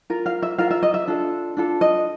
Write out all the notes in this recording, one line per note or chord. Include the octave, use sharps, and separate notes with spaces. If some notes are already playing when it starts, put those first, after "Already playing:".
F4 A#4
F5
E5
F4 A#4 F5
E5
D#5
E5
D4 F4 A4
D4 F4 A4
D#5